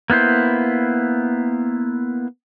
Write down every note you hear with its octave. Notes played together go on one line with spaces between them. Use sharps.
A#3 B3 E4 C5